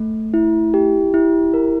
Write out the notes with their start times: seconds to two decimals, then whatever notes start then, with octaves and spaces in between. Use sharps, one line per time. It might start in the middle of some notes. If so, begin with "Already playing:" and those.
Already playing: A3
0.34 E4
0.74 G4
1.14 E4
1.54 A#4